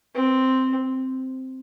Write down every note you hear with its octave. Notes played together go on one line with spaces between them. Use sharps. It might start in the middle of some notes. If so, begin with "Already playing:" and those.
C4